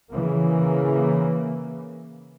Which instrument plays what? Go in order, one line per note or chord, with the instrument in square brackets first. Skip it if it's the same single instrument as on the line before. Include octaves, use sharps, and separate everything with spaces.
[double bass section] C#3 E3 A#3